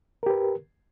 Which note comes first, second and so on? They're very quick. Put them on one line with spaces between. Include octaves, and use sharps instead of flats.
A#4 G4 B4